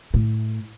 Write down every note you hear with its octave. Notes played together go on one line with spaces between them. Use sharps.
A2